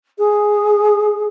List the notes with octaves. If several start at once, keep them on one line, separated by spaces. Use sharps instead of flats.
G#4